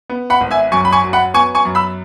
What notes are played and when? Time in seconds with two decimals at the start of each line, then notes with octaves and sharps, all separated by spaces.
0.09 B3
0.30 F#5 B5
0.41 G#1
0.51 E5 G#5
0.72 F#2 G#5 C#6
0.85 B5
0.92 G#5 C#6
1.03 F#3
1.13 F#5 B5
1.34 B3 G#5 C#6
1.55 G#5 C#6
1.65 F#2
1.75 B5 E6